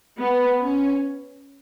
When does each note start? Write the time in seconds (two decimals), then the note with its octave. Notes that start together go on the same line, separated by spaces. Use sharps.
0.19 B3
0.61 C#4